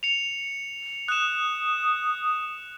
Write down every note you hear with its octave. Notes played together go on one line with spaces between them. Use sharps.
C#7 F7
D#6 F#6 E7